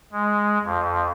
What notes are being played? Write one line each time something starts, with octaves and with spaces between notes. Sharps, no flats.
G#3
F2